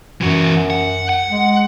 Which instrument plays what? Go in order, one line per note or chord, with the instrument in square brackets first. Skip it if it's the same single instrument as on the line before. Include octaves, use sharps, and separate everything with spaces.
[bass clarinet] F#2 [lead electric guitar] E3 F#4
[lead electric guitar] F#5
F#5
[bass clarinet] G#3